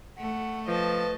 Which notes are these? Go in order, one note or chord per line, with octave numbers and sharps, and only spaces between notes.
A3 F#5
F3 B4 D#5 A5